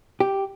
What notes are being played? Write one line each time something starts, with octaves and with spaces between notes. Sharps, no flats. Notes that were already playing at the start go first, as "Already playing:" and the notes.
G4